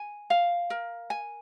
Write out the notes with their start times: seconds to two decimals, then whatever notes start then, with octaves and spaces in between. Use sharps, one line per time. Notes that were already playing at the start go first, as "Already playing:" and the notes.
Already playing: G#5
0.30 F5
0.70 A#4
1.10 G#5